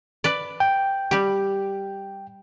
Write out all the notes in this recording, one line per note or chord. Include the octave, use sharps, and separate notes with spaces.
B4 D5
G5
G3 G4